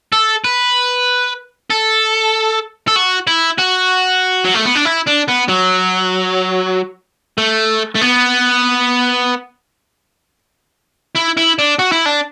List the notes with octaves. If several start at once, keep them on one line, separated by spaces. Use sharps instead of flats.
A4
B4
A4
A4
F#4
E4
F#4
F#3
A3
B3
D4
E4
D4
B3
F#3
A3
A3
B3
E4
E4
D4
F#4
E4
D4